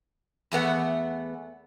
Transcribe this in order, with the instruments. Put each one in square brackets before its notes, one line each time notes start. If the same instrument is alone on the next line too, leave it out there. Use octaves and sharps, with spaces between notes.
[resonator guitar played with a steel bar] E2 A3 B3 F#5